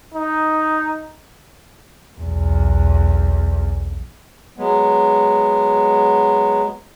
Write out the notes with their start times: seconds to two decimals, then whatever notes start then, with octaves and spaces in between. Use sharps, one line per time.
0.14 D#4
2.19 B1 E2
4.58 F#3 G#3 B3